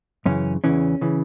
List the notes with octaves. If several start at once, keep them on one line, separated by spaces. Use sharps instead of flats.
F#2 C#3 E3 C#4
E2 C#3 E3 C#4
C#3 E3